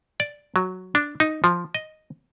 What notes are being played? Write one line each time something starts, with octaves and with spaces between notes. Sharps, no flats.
D5
F#3
D4
D#4
F3
D#5